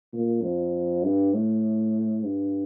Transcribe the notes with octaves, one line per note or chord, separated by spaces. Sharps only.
A#2
F2
G2
A2
G2